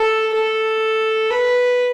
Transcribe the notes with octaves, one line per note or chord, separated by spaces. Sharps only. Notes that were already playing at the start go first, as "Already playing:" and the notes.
Already playing: A4
A4
B4